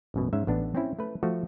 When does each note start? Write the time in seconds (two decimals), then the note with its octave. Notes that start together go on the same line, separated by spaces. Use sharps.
0.14 A1 F#2 B2
0.33 G#2 C#4 E5
0.47 A1 B3 D4
0.75 C4 C#4 E4
0.99 A3 B4
1.23 F3 A3 F#4